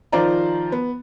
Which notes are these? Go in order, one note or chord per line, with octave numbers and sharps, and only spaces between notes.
D#3 F3 F4 C5 D5 A#5
B3